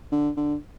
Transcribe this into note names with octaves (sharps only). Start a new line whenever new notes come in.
D3
D3